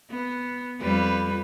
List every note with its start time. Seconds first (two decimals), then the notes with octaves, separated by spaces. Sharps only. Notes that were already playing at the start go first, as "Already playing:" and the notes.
0.10 B3
0.81 F2 G3 B4